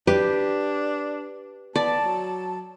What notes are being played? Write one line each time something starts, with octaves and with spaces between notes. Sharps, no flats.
D4 G4 B4
B3 D5 A5
F#3